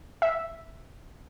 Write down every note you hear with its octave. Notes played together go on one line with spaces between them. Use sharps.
E5